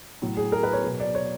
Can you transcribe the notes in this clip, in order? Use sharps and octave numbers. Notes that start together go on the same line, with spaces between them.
A2 F#3
G#4
A#4
B4
C#5
B2 F#3
D5
C#5